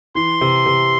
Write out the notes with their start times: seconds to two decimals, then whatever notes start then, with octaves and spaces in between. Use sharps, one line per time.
0.15 E3 C6
0.41 C3
0.66 C3